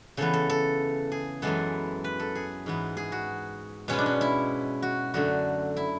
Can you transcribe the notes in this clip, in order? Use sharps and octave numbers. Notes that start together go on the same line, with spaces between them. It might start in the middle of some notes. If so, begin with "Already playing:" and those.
C#3 E3 B3 A4
A4
A4
G#4
F#2 E3 G#3 B3 A4
B4
A4
G#4
G#2 E3 B3
G#4
F#4
B2 G#3 B3 C#4
D4
C#4
E4
F#4
F#2 D3 A3 F#4
E4